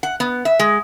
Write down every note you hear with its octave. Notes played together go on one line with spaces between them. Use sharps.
F#5
B3
E5
G#3